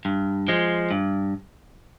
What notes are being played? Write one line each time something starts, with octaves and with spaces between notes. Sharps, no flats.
G2
F3 G#3
G2